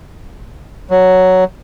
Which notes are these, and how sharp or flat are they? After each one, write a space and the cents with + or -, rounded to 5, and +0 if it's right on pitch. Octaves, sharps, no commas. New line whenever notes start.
F#3 +5